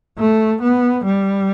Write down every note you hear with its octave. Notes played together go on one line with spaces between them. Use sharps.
A3
B3
G3